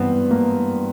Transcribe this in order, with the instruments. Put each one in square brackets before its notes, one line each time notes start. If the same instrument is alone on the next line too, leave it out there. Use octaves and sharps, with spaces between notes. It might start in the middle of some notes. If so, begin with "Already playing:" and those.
Already playing: [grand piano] G2 E3 B3 C4
A#3